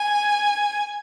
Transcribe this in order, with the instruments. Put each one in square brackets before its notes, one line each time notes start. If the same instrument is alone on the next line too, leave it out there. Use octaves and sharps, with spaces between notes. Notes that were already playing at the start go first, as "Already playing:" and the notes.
Already playing: [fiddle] G#5